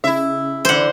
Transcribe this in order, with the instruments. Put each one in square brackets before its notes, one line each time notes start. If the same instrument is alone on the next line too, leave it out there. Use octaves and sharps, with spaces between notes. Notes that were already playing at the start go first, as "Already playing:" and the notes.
[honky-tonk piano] C#3 [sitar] E4 E5
[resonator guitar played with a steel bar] D3 E3 [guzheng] C5 F#5